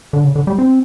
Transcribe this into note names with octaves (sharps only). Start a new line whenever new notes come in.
D3
C#3
D3
G3
C4